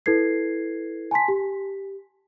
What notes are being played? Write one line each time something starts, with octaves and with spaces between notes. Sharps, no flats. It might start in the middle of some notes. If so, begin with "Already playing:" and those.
E4 A4 B4 G#6 C7
G#5 A5 C6 B6
G4